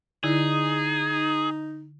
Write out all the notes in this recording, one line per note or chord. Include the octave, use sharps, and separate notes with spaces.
D3 D#4 E4 G#4